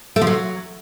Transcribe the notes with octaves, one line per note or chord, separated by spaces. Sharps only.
A3
F3
F#3